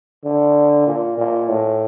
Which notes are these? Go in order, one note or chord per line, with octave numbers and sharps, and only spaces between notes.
D3
A#2
A#2
A2